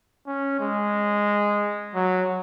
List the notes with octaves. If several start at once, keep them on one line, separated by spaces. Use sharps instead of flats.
C#4
G#3
F#3